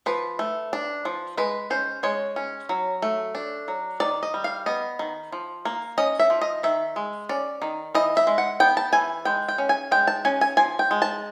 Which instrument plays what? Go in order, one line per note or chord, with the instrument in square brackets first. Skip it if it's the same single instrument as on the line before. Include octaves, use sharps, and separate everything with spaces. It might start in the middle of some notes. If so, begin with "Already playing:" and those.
[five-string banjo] F3 B4
A3
D4
F3
G#3 B4
C#4 C5
G#3 C#5
C#4
F#3
A3
D4
F#3
D#3 D5
D#5
G3
F5
B3 D#5
D#3
F3
A#3
C#4 D#5
E5
F3
D#5
D#3 E5
G#3
C#4 D5
D#3
E3 D#5
E5
G#3
F#5
B3 G5
A5
E3 G#5
G#3 G5
G5
C#4
G#5
G#3 G5
A5
C#4 G#5
G#5
F3 G#5
G5
G#3
A5